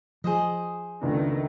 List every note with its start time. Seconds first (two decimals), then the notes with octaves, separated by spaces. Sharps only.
0.24 F3 G#4 C5 D#5
1.01 C#2 D#3 A3 B3 D4